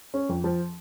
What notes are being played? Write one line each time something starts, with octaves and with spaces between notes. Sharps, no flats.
C#4
F2
F3